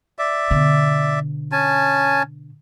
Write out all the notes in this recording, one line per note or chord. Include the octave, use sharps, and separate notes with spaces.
D5 E5
B2 D3
C#4 G#5 A5